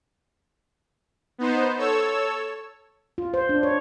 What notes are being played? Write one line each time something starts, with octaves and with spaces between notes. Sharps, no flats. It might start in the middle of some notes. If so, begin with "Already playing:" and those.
B3 D#4 C5
A4 C#5 E6
F4
C5
D4
C#5